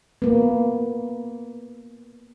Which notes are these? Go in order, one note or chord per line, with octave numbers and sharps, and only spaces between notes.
A#3 B3